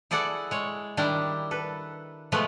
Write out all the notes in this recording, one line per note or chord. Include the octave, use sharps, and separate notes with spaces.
E4 G#4 A4 D5 F#5
G#3 C#5
D#3 G3 D4 E4
A4 B4
B2 F3 G#3 A3 B3 B4